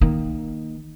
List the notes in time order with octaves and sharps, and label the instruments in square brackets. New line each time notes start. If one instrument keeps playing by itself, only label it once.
[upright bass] D#3 A#3